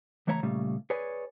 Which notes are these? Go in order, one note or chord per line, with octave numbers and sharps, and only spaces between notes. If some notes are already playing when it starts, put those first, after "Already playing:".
C#2 E3 A3 C#5 D#5 A#5
A#2 C#3 G3 A3
G#4 B4 C#5 D5 G#5